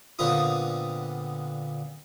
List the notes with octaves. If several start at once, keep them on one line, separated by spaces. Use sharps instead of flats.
A#2 D3 B3 C4 F4 D#6